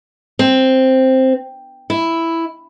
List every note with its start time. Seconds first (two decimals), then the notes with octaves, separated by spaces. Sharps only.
0.39 C4
1.90 E4